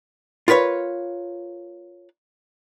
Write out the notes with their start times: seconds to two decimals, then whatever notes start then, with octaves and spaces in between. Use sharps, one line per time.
0.48 F4 A#4 B4 C#5 F5